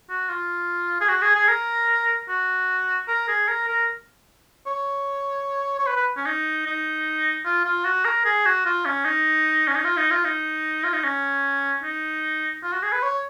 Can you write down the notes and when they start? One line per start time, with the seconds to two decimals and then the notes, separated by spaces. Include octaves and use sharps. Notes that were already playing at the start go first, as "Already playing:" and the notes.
0.10 F#4
0.29 F4
1.01 G#4
1.09 F#4
1.22 G#4
1.35 G#4
1.49 A#4
2.29 F#4
3.08 A#4
3.28 G#4
3.49 A#4
3.68 A#4
4.67 C#5
5.79 C#5
5.87 B4
5.97 B4
6.17 C#4
6.26 D#4
6.66 D#4
7.45 F4
7.65 F4
7.85 F#4
8.05 A#4
8.25 G#4
8.46 F#4
8.66 F4
8.85 C#4
9.05 D#4
9.68 C#4
9.76 D#4
9.85 F4
9.97 D#4
10.11 F4
10.25 D#4
10.84 F4
10.93 D#4
11.04 C#4
11.84 D#4
12.63 F4
12.73 F#4
12.83 G#4
12.93 B4
13.03 C#5